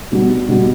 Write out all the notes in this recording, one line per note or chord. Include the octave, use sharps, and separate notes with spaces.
B2 G3 B3
B2 G3 B3